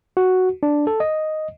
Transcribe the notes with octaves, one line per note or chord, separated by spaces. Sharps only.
F#4
D4
A4
D#5